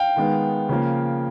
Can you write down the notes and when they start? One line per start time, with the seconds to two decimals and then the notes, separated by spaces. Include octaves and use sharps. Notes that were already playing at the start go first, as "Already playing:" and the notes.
Already playing: F5 G5
0.16 D#3 G#3 B3
0.69 C#3 F3 A#3